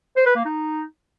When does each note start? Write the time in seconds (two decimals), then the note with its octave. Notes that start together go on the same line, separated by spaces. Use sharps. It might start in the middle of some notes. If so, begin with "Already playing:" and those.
0.17 C5
0.26 B4
0.36 A#3
0.45 D#4